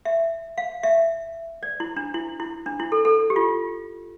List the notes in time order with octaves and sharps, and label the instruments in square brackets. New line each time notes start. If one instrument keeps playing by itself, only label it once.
[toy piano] E5
F5
E5
D5
E4
D4
E4
E4
D4
E4
A4
A4
G4
F4